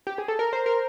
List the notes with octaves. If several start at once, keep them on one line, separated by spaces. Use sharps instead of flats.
G4
G#4
A4
A#4
C5
A#4